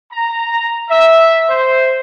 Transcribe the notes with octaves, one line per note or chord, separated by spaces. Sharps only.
A#5
E5
C5